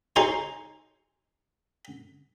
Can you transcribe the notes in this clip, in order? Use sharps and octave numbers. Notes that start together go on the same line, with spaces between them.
D#4 G#4 C5 C#5